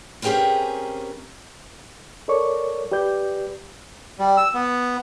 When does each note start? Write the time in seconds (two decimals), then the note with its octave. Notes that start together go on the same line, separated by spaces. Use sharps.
0.22 C4 C#4 G4 G#4 A#4 B4
2.28 A4 A#4 C#5 D5 C#6
2.92 G4 B4 D5 G6
4.19 G3
4.37 E6
4.54 B3